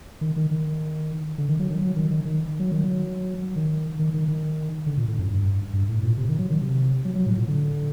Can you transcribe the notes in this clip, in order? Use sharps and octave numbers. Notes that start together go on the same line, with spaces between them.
D#3
D#3
D#3
D3
D#3
F#3
D#3
F#3
D#3
D#3
D#3
F#3
D#3
F#3
D#3
D#3
D#3
D#3
D3
A#2
A2
F#2
G2
G2
A2
A#2
C3
D#3
F#3
D#3
C3
F#3
F#3
A2
A#2
D3